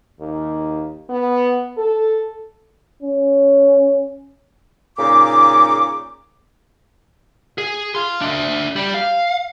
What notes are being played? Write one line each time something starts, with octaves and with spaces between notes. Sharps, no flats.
D#2
B3
A4
C#4
A#2 C#3 D#4 D6
G#4
F5 C6
D4 E5
G3
F5